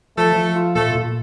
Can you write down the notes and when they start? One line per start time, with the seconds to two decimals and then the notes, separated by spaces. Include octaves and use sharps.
0.17 F3 A3 A4
0.36 F3
0.56 F4
0.75 A#2 A3 A4
0.95 A#2